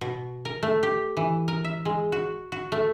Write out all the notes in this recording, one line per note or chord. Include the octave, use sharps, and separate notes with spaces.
B2
A#4
A3
G4
E3
A#4
E5
G#3
F#4
F#4
A3